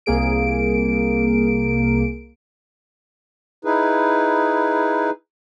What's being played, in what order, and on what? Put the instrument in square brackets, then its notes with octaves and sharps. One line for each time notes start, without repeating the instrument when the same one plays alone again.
[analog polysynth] C2 A#3 G#4 D7
[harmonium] D#4 E4 G#4 B4